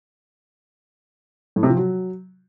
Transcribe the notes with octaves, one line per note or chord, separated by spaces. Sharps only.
A2
C3
F3
F#3